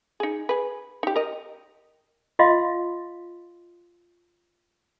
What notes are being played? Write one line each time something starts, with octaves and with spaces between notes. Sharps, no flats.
D#4 G#4
G#4 B4
D#4 G4
A#4 D#5
F4 D#5 F5 C6